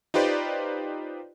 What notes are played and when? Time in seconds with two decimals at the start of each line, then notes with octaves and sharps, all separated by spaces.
0.14 D#4 F4 G4 B4 C5 D5